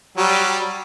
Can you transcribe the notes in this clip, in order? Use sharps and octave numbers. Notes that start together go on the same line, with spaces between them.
F#3 G3